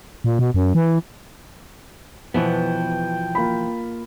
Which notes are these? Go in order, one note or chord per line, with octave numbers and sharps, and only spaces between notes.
A#2
B2
F#2
E3
B2 E3 F3 B3 G5
A#3 F4 B5